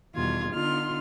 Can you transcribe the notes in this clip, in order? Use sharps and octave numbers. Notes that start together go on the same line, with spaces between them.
E2 B2 D#3 G3 F4 G#6
D3 B3 D#4 F4 C6 F6